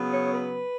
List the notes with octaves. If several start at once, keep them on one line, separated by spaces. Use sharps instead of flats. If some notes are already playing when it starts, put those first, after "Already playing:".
Already playing: C#3 F#3 B3
C#5
B4